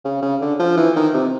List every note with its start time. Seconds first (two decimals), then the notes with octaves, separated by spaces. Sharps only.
0.04 C#3
0.22 C#3
0.41 D3
0.59 F3
0.77 E3
0.96 D#3
1.14 C3